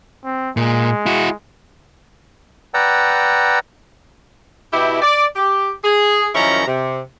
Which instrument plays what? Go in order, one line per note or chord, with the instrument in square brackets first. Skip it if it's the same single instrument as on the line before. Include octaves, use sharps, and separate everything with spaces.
[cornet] C4
[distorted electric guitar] A#2 [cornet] G#3
[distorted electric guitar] E4 F#4
[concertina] B4 D5 F#5 G5 A#5 E6
[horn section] B2 E4 G4
D5
G4
G#4
F#2 D#3 F3 C#4 E4 A#5
C3